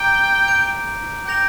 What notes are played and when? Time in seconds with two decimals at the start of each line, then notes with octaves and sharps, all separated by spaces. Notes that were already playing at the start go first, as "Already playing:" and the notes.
Already playing: G5 A#5 D6 G6
0.47 G6 D7 F7
1.26 G5 D6 G6 A#6 F7